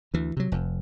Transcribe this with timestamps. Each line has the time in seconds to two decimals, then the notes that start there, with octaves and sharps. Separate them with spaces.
0.14 D2 E3
0.37 C3 F#3
0.52 F1 F2